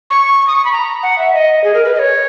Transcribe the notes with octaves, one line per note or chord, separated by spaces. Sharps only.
C#6
D#6
C#6
B5
A#5
F#5
E5
D#5
G#4
A#4
B4
D#5
C#5